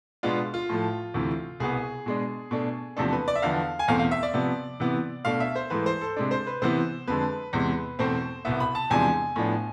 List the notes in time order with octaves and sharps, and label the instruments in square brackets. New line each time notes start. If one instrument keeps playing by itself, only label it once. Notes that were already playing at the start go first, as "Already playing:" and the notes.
[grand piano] B2 G#3 B3 D4 F4
F4
A2 F3 A3
D2 C3 E3
C2 B2 B3 G#4
B2 G#3 D4
B2 A3 D4
E2 C3 F3 A3 D4 A4
B4
D5
E5
E2 D3 F3 B3 F5
G#5
E2 B2 A3 C4 F5
F5
E5
D5
C3 F3 B3
C3 E3 B3
B2 A3 D4 F5
E5
C5
G#2 E3 A3 B4
C5
A4
C3 G#3 D4
C5
B4
C3 E3 B3 C5
F2 D3 G#3 B4
E2 C3 G#3
E2 B2 A3 C4 C5
C2 B2 B3 E5
B5
A5
E2 C3 F3 G#3 D4 G#5
A2 F3 B3 D4